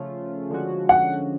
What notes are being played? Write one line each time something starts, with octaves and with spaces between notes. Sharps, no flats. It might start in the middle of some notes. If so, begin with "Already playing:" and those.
Already playing: C#3 F3 A3 C#4 F4
D3 F3 G#3 C#4 F#4
F#5